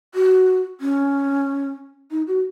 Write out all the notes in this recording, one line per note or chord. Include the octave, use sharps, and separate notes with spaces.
F#4
C#4
D#4
F#4